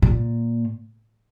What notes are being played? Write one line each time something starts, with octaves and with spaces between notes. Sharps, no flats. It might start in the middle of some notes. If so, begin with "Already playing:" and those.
A#2